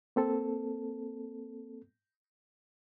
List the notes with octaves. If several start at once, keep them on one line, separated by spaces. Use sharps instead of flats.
A#3 C4 A4